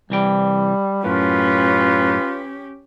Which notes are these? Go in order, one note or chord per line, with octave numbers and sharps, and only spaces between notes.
C2 E3 G3 G5
F#2 A2 C#4 F4 G4 B4